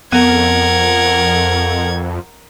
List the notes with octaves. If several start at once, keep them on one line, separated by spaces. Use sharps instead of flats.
F2 B3 A#4 F#5 G#6